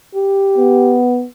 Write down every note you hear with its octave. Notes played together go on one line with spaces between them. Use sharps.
G4
B3